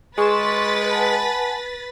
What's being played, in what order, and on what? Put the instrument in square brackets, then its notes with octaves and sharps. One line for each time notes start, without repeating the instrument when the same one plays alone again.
[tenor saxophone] G#3 [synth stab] G#4 E7 [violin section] B4 A6 B6 [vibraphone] C6 C#6
[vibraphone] F#5 G#5 A5